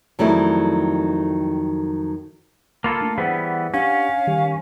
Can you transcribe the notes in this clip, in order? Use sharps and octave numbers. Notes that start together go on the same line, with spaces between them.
F2 D#3 F#3 G3 A3 E4
A#3 F4 A4 B5 F6 G#6
A3 D4
E3 G3 B3 G#4 C5 F#5
C#4 D4 G4 F5 F#5
D#3 G3 G4